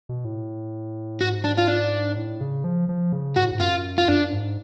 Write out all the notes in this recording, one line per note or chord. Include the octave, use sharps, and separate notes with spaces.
B2
A2
G#2 F#4
D4
F4
D4
A2
C#3
F3
F3
C#3
G#2 F#4
A2
G#2
F#2 F4
F4
F#2 D4
G#2